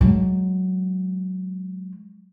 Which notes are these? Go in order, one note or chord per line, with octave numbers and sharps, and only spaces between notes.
F#3 G#3